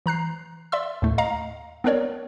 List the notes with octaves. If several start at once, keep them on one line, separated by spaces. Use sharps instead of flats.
E3 A#5 F#6 C7
D5 E5 C6 E6
D#2 A2 A3
D#5 F5 A#5
B3 C4 D4 A#4 C#5 D5